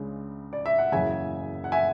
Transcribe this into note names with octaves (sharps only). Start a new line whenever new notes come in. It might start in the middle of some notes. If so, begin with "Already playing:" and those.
Already playing: C#2 C#3 G#3 D4
D5
E5
F#5
F#1 E2 C#3 E5 G#5
F#5
E5 G#5